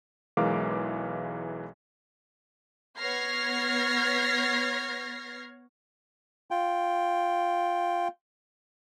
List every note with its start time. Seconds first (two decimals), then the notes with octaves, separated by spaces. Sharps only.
0.37 B1 E3 G#3 A#4 F5 D6
2.98 B3 C#5 F6 G#6 A#6 C7
6.51 F4 G5